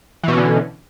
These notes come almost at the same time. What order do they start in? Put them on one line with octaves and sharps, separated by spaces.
E3 B2 C#4 D3